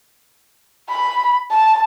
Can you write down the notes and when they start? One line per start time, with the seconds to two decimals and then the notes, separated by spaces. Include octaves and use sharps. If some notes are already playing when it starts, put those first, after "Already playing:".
0.89 B5
1.51 A5